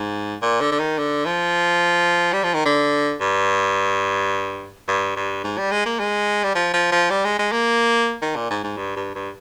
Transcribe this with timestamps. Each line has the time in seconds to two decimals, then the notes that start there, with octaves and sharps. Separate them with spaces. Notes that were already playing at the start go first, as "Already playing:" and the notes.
Already playing: G#2
0.42 A#2
0.61 D3
0.72 D3
0.79 D#3
0.98 D3
1.26 F3
2.33 G3
2.43 F3
2.54 D#3
2.65 D3
3.21 G2
4.88 G2
5.16 G2
5.44 G#2
5.58 G3
5.71 G#3
5.86 A#3
5.99 G#3
6.44 G3
6.55 F3
6.73 F3
6.92 F3
7.10 G3
7.25 G#3
7.39 G#3
7.52 A#3
8.22 D#3
8.36 A#2
8.50 G#2
8.63 G#2
8.77 G2
8.96 G2
9.15 G2